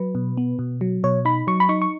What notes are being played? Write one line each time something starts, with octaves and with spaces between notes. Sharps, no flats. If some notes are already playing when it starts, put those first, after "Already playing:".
Already playing: F#3 B4
B2
B3
B2
F#3
B2 C#5
D#4 B5
F#3 C#6
B5
D#4 C#6
C#6